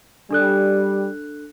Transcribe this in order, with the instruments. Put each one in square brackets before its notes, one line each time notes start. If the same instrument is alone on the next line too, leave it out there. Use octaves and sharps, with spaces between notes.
[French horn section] G3 [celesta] D4 A4 F#6